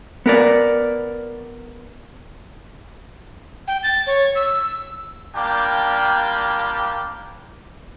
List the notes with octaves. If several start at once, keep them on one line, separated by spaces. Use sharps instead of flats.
B3 A#4 D5
G5
A6
C#5
E6
G3 A#3 D4 F4 G4 G5